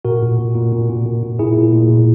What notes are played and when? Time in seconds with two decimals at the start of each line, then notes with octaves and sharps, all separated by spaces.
0.05 A#2 F#4 A#4
0.22 A#2
0.39 A#2
0.55 A#2
0.72 A#2
0.89 A#2
1.06 A#2
1.22 A#2
1.39 A#2 E4 G#4
1.56 A#2
1.73 A#2
1.90 A#2